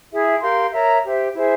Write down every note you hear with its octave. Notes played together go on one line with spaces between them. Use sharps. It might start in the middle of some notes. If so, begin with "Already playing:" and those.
E4 G#4 E5
G4 A#4 F5 C6
A#4 C#5 E5 A#5
G4 C5 E5
E4 G#4 C5 E5